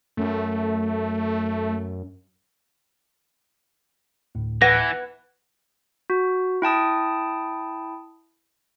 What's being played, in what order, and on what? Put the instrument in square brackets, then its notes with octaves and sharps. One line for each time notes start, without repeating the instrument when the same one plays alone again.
[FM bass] F#2 [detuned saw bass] A3
[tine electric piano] D2 A2
[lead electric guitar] E3 [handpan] B4 F#5 [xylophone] A#6
[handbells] F#4
E4 G5 A5 D#6